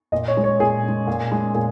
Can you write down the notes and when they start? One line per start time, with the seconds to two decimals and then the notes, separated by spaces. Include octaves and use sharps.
0.12 A#2 D#5
0.28 C#5
0.36 G#3 C#4
0.44 C#5
0.60 A#2 G#4
0.83 C#4
0.88 G#3
1.07 A#2
1.32 G#3 C#4
1.55 A#2 G#4